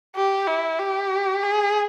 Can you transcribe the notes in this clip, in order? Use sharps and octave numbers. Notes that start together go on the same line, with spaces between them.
G4
E4
G4
G#4